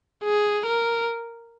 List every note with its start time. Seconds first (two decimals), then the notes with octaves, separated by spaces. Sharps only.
0.24 G#4
0.66 A#4